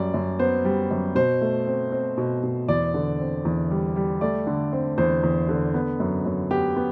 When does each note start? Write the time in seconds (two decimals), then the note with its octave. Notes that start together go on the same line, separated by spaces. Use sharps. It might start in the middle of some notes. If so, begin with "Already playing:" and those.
Already playing: F#2 G3 D5
0.14 F#2
0.39 B3 C5
0.65 G3
0.91 F#2
1.15 B2 C5
1.41 A3
1.67 C4
1.92 C4
2.18 B2
2.43 B2
2.68 E2 D5
2.94 D3
3.20 C4
3.45 E2
3.71 G3
3.96 G3
4.21 A3 D5
4.47 D3
4.73 C4
4.98 E2 C5
5.23 E2
5.49 D3
5.74 B3
6.00 F#2
6.25 F#2
6.51 B3 G4
6.76 B3